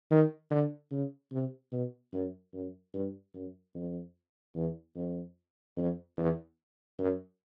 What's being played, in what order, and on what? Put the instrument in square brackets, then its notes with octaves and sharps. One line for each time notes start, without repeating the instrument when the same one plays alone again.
[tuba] D#3
D3
C#3
C3
B2
F#2
F#2
G2
F#2
F2
E2
F2
F2
E2
F#2